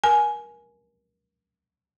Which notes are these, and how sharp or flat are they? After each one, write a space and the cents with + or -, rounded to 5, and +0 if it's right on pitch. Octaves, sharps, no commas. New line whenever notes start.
A#4 +30 G#5 +15